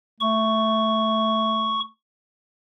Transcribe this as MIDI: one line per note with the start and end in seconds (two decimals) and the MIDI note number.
0.20 1.88 57
0.20 1.80 85